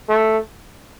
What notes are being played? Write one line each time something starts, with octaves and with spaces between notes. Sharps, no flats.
A3